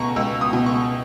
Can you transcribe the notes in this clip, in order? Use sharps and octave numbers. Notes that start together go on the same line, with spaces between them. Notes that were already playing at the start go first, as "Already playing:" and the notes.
Already playing: C#2 B2 A#5 C#6
C#2 E6
D#6
B2
C#6